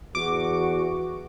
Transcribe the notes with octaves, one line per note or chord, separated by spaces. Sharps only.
E2 F#4 D6